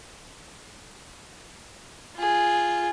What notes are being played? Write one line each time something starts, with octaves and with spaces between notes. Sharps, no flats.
F4 G#4